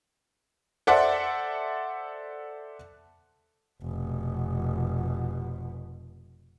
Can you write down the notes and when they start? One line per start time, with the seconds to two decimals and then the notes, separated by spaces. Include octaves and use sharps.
0.87 A4 C5 D5 E5 F#5
3.81 F1 B2